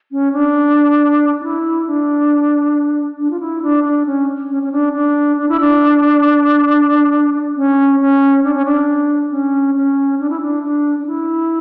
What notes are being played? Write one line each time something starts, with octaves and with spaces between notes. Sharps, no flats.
C#4
D4
D4
E4
D4
D4
F4
E4
D4
D4
C#4
C#4
C#4
D4
D4
D4
E4
D4
C#4
C#4
D4
C#4
D4
C#4
C#4
D4
E4
D4
D4
D4
E4